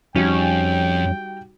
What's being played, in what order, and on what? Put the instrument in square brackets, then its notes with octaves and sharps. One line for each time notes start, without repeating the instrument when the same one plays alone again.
[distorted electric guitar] F2 [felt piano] G3 D#4 F#4 [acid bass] C#4 [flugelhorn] G5